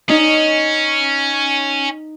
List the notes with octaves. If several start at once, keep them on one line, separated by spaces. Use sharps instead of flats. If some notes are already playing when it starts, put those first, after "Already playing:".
C#4 D#4